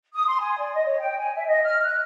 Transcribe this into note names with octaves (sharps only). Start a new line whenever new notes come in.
D#6
C6
G#5
D5
D#5
C#5
G5
G#5
E5
D#5
F6
F#6